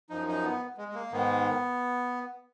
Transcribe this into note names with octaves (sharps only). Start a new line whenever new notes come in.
F#2 F3 D#4
D#4
B3
G#3
G#3
A#3
G#2 D#3 B3